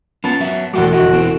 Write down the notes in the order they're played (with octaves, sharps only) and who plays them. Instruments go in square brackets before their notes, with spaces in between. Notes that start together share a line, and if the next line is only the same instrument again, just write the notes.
[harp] B3 A5 [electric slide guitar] C#4 F4
[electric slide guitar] F#3 E5
[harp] E1 D6 [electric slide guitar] G#3 A3 G4 [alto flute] F#4
[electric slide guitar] F2 D3 D#5 [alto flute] F#4
[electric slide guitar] B2 E3 C4